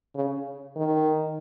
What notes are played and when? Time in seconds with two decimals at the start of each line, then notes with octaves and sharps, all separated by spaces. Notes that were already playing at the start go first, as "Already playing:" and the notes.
0.15 C#3
0.76 D#3